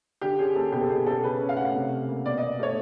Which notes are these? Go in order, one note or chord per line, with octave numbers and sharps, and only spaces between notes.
D3 G4
C#4 G#4
A#3 A4
B2 G4
A4
B2 G#4
C#4 A4
C#3 B4
C#4
F5
A3 F#5
F5
C3
C#4
A#3
B2 D5
B2 D#5
A3 C#5